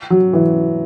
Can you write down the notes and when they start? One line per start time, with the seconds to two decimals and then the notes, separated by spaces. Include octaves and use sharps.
0.10 F#3
0.33 E3